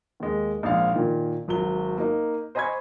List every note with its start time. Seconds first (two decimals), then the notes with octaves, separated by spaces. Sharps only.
0.20 D#2 G#3
0.63 A#1 G#2 F5
0.96 A#2 D#3
1.48 G#1 F#3 G7
1.98 A#3 D#4
2.55 C5 D#5 G#5 B5 C#6 G#6